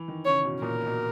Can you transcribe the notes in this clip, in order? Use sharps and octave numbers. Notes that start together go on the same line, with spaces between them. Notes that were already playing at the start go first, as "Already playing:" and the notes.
Already playing: E3
D#3
C#3 C#5
B2
A#2 A#4
B2